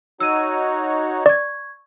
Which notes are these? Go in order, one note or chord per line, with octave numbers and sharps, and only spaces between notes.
D#4 F#4 C#5 E6 D#7
D5 C#6 G#6